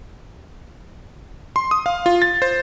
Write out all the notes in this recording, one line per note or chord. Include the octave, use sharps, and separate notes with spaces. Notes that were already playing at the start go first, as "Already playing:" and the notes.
C6
D#6
F5
F4
A6
C5